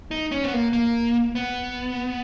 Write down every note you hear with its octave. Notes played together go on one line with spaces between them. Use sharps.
D#4
C#4
B3
A#3
A#3
B3